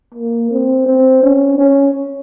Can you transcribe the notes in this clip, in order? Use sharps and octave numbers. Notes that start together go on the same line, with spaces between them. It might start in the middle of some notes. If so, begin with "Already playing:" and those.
A#3
C4
C4
C#4
C#4